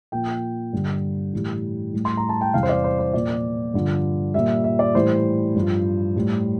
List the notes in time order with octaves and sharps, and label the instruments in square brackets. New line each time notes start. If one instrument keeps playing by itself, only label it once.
[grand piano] A#2 F3 G5
G2 D3 G3
A2 E3 G3
A2 G3
C6
A#5
A5
G5
E2 C3 E3 G3 F5
C5
D5
C5
C5
A#2 F3 D5
G2 D3 F3
A#2 G3 E5
E5
D5
A2 E3 G3 C5
G2 F3
A2 G3